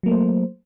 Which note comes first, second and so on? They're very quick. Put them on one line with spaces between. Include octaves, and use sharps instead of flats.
F#3 A#3 A3 C5